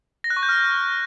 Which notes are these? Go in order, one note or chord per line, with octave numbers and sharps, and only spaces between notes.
A#6
F#6
C#6
G6
F6